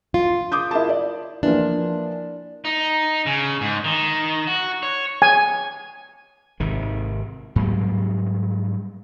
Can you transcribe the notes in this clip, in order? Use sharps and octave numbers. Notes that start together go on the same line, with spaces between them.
F4
D6 D#6 G6
E4 A#4 A5
D5
E3 F3 A#3 D4
D#4
C#3
G#2
D#3
F#4
C#5
G#5
G#1 C3 D#3
G#2 F#3 G3 A#3